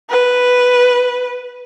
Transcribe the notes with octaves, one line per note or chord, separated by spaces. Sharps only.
B4